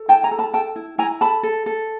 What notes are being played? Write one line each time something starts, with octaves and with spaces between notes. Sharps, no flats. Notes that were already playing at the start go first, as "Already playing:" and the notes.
Already playing: A4
E4 G5 A5
G#5 A#5
A4
A5 B5
A4 G5 A5
E4
E4 G#5 A#5
A4 A5 B5
A4
A4